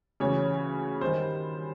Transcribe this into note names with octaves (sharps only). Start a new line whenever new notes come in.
D2 C#3 E3 C#5
G2 D#3 C5